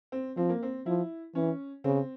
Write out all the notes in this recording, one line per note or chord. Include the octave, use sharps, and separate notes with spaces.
C4
F3 C4
A#3
C4
F3 E4
E3 C#4
C#3 C4